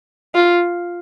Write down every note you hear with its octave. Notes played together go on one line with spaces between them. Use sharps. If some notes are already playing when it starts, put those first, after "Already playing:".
F4